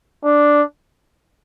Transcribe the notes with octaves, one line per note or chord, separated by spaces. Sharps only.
D4